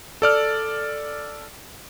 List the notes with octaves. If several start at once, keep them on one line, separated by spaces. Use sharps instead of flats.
A4 D5 F6